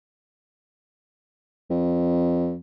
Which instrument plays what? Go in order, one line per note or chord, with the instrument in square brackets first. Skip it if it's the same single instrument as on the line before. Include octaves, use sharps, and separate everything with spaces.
[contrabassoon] F2